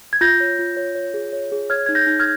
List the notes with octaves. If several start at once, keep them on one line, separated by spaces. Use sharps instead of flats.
G#6
F4 G6 A#6
C#5
F4
C#5
C#5
G#4
C#5
G#4
C#5 F6 G#6
D#4 G#6
G6 A#6
D#4
F6 G#6